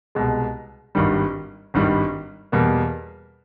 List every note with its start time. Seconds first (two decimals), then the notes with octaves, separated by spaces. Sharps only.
0.15 C2 B2 G#3
0.95 G#1 G2 D#3 G3
1.74 G#1 G2 D#3 G3
2.52 E2 B2 G3 A#3